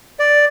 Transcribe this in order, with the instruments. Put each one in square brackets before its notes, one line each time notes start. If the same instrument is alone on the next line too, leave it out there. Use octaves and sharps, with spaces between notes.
[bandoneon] D5